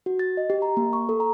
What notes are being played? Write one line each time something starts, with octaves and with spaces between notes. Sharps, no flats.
F#4
A6
D#5
G4
A#5
A#3
C#6
A4
A#5